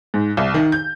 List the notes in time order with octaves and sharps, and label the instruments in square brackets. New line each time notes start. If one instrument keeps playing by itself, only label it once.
[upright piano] G#2
C2
D#3
G6